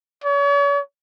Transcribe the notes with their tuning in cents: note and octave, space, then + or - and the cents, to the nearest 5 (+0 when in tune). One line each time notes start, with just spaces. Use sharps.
C#5 +40